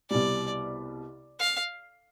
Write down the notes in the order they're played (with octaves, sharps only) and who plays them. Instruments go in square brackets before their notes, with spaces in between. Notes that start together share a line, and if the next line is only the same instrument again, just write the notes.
[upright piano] C2 B2 G3 [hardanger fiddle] D5
[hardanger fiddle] F5